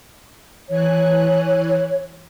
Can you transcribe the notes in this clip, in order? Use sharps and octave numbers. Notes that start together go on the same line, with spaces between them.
E3 C#5 G#5 F#6